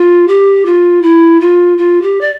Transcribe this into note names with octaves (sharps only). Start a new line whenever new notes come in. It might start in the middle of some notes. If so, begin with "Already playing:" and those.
Already playing: F4
G4
F4
E4
F4
F4
G4
D5